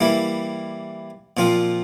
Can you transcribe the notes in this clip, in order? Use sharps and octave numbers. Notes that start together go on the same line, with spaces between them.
E3 G3 A#3 E4
A#2 F3 C4 F4